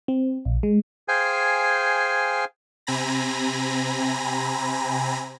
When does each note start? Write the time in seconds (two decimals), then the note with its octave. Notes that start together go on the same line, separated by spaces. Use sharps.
0.08 C4
0.45 A#1
0.63 G#3
1.08 G#4 C5 F5 G5 G#5
2.87 C3 C4 G#5 A#5 B5 A#6